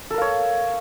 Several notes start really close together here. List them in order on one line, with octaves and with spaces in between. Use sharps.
A4 A#4 F5 C#5